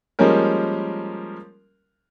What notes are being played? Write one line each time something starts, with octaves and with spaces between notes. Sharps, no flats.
F3 G3 G#3 A#3 C#4 A#4